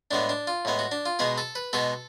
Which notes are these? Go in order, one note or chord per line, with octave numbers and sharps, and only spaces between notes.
A2 G#3 B3 D4
D4
F4
A2 G#3 B3
F#4
D4
F4
B2 G#3 B3 G#4
A4
B4
B2 G#3 B3 A4